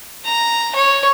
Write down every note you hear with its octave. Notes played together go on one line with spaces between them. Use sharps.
A#5
C#5